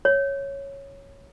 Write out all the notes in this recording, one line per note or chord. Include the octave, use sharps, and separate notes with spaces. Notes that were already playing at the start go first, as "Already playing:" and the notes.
C#5